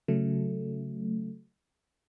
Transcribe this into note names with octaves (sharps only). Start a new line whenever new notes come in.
C#3 F#3 A3